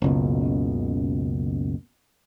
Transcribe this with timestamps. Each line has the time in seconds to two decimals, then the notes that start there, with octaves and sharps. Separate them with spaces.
0.02 F#1 C#2 B2